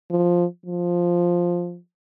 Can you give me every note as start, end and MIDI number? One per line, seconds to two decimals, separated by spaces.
0.10 0.45 53
0.66 1.78 53